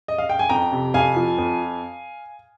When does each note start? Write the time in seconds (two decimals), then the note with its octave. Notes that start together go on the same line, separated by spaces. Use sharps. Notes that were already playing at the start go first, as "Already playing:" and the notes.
0.08 D#5
0.18 F5
0.29 G5
0.39 G#5
0.49 F2 G5 A#5
0.72 C3
0.94 F2 F5 G#5
1.17 F3
1.38 F2